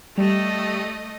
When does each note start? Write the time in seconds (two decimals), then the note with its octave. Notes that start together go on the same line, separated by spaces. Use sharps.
0.17 G3 A3 D#5